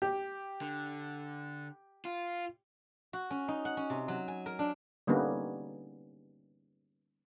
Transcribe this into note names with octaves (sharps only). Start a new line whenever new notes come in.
G4
D3
F4
F#4
C#4
D#4
F#5
C#4
C3
F#3
G#5
A#4
D4
D3 G3 A#3 B3 C#4 D#4